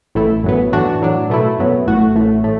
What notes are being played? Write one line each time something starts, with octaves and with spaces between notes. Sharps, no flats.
A1 A2 A3 E4
F#2 F#3 B3
A2 E3 D4 F#4
A2 F#3 D4
B2 A3 E4
F#2 F#3 B3
A1 A2 A3 F#4
A1 A2 A3
A2 A3